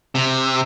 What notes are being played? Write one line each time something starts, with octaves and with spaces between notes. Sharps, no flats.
C3